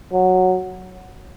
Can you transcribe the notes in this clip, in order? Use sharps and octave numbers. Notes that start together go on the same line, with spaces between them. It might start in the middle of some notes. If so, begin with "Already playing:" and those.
F#3